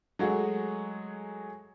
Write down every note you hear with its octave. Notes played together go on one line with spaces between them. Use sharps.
F#3 G#3 A3 F#4 G#4